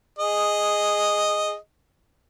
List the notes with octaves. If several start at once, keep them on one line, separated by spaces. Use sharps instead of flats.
G#4 D#5